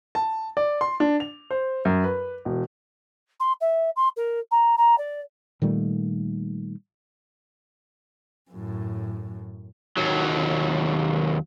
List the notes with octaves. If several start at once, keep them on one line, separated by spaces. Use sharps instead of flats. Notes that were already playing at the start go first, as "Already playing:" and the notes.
A5
D5
C6
D4
F7
C5
F#2
B4
E1
C6
E5
C6
A#4
A#5
A#5
D5
A#2 D#3 G3 A3
F#2 A2
D#2 F#3